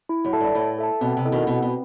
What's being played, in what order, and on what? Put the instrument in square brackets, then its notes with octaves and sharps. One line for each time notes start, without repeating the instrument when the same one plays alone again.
[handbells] E4
[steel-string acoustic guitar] F#2
[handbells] A4 E5 A5
[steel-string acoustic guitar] G2
[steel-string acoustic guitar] A2 [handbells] E4
[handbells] A4 E5 A5
[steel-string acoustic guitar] B2 [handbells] C4
[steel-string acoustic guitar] C3
[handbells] E4 A4 D#5
[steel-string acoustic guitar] B2 D#3
[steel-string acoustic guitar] B2 [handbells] C4
[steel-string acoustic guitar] B2